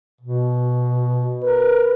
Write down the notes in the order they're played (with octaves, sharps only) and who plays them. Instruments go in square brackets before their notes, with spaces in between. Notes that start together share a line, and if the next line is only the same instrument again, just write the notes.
[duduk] B2
[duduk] A#4 [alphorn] B4